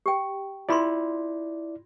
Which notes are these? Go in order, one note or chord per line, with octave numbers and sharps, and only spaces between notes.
G4 G5
E4 F4 D5 B5 C6